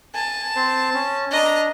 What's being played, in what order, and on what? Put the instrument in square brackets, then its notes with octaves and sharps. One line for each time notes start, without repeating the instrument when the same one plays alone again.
[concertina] G#5 [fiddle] A5
[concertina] C4 C5
C#4
[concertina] D4 [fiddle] D#5 A#5